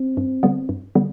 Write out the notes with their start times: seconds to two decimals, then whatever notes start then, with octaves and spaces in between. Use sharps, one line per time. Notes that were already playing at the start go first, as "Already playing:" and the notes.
Already playing: C4
0.17 G2
0.43 D3 G3 B3
0.69 G2
0.95 D3 G3 B3